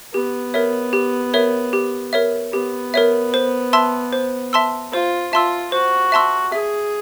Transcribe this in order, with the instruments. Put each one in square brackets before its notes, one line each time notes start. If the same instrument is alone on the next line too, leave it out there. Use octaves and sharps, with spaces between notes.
[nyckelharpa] B3 [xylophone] G4
[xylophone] A#4 C#5 E5
G4
A#4 C#5 E5
G4
A#4 C#5 E5
[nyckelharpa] B3 [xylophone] G4
[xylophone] A#4 C#5 E5
C5
E5 A5 C6 E6
C5
E5 A5 C6 E6
[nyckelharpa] F4 [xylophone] C5
[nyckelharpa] F4 [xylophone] E5 A5 C6 E6
[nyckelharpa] F#4 [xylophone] C5
[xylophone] E5 A5 C6 E6
[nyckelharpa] G#4 [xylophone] E5